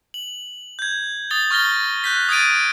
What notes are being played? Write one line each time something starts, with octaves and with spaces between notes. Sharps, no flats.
F#7
G6 G#6
D#6 A6 G7
C#6 F6 A6 A#6 G7
F#6 G6 B6
D#6 G#6 A6 D7 D#7